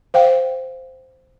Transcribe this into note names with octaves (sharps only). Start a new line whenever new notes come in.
C5 F5 G5